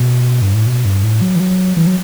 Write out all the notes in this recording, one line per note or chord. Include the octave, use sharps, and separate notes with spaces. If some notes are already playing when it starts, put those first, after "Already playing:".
Already playing: B2
G2
A2
B2
G2
A2
F#3
E3
F#3
E3
F#3